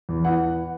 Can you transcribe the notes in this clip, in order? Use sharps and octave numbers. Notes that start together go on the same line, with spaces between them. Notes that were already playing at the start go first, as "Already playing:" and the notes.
E2
E3 F#5